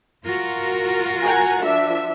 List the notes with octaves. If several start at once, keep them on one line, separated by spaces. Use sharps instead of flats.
F4 F#4 A#4
F#5 G#5 A#5
F3 D4 E5